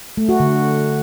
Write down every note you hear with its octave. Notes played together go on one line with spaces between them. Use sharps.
A3
F#4
D3